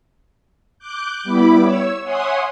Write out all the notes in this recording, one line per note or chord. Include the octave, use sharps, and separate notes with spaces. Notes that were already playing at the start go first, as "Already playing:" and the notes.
D6 F#6 G6
G3 B3 E4 B5 D6
C#5 E6
C#5 E5 F#5 G#5 C6 D#6